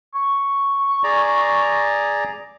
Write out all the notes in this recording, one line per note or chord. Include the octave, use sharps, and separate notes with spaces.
C#6
G#4 D5 A#5